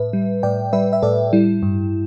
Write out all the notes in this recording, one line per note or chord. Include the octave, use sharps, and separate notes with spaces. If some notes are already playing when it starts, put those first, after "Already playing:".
Already playing: A2 B4 E5
G3
A2 D5 G5
G3 B4 E5
E5
A2 A4 D5
G3 E4
G2